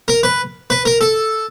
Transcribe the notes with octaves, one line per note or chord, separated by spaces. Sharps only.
A#4
B4
B4
A#4
A4